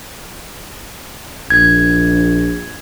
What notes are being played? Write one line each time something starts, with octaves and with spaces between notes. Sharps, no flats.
A#1 G#6